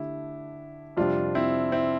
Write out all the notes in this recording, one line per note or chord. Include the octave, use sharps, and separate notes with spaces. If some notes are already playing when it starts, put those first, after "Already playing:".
Already playing: D3 A3 D4 E4 G4
F2 C3 G3 D4 F4
C4 E4
C4 E4